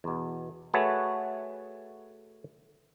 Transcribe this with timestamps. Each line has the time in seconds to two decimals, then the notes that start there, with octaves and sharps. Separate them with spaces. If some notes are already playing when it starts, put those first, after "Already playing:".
0.04 E2 B2
0.74 A3 F#4 G#4 A4 B4 C#5